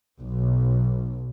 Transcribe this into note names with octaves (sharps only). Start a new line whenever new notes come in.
B1